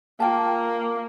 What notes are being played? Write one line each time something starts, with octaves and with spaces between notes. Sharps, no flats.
A#3 F4 G5 A5